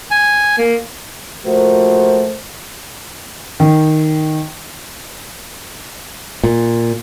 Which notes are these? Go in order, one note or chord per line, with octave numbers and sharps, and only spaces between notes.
G#5
A#3
A#2 F3 A3 F#4 A#4 C5
D#3
A#2